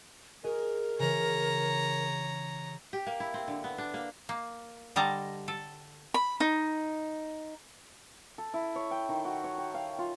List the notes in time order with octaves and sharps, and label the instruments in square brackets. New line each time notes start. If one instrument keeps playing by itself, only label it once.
[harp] F#4 G#4 D#5 [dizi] A#4
[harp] C#3 E3 [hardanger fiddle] C#5 A#5
[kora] G4
A#3
E4
C4
D3
B3
D4
A#3
[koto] A#3
D3 G3 D#5 A5 A#5
A4
[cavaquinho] B5
D#4
[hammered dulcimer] A4
E4
C#5
G5
D#3
F#4
C#5
G5
F5
F4